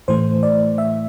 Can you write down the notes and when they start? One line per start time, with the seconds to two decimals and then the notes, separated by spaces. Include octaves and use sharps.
0.08 A2 E3 A3 C5
0.43 D5
0.78 E5